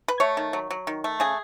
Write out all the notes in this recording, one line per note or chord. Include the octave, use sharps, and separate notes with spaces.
B4
A3 C#5
D#3
F#3
F#3
D#3
A3
C#3 G#4